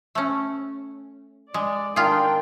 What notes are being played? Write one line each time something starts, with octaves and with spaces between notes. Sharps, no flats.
A3 C#4
G#3 D5
D#3 D4 F4 G#4 G5